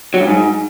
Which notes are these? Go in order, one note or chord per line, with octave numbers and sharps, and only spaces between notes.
F#3
G2
G#2